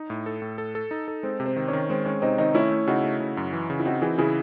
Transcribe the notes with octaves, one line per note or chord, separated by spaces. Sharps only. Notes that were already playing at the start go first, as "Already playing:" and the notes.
Already playing: D#4
A2
A4
A2
A4
A4
D#4
A4
G#3 C4
C3
C4
D#3
C#4
D#3
G#3 C4
G#3 C#4
C3 C4 D#4
D#3 C4 D#4
A3 C#4 E4
A3
C#3 D#4 F#4
A3
C#3
F#2
E3
C#3
E4
C4 D#4 F#4
E3 E4 G#4
C#3 E4 G#4